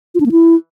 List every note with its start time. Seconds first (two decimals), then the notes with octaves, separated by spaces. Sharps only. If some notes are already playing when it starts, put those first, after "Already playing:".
0.15 F4
0.20 D4
0.26 A#3
0.32 E4